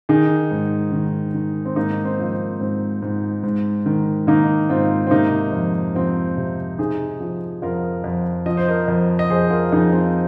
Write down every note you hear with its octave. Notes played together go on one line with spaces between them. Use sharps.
D#3 D#4 G#4
G#2
D#3
D#3
C4
G#2 A#3 D#4
C4
F3 A#3
C4
G#2 C4
G#2
G#2
D#3
D#3 A#3 D#4
G#2 C4 F4
C4
C3 A#3 D#4
F2
F2 C4 F4
C3
C3 D#4 G#4
F3
F2 F4 A#4
F2
F3 D#5
C5
A#4 D#5
F2
D#5
F2 G#4 C5
F4 A#4
F2 D#4 G#4
C4 F4